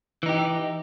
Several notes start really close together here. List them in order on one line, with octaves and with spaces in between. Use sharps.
E3 D#4 G4